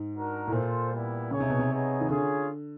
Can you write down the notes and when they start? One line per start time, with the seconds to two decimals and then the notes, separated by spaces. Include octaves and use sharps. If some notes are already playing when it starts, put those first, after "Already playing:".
Already playing: G#2
0.14 D4 F#4 A#4
0.47 A2
0.52 A#2 F4 A4 C5
0.91 G3 B3 E4
1.31 C#3 D#4 G#4 C#5
1.40 C3
1.50 B2
1.59 C3
1.70 B3 D#4 G#4 C#5
2.01 D#3
2.09 D3 C#4 F4 G#4